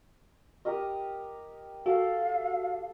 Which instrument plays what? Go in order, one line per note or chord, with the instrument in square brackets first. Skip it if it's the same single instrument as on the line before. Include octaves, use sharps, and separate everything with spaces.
[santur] G4 A#4 D#5
[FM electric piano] F#4 [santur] A4 [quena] F5